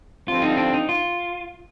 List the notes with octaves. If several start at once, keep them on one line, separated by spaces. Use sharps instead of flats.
G2 D3 F3 C4 F4
D#4
D4
D#4
F4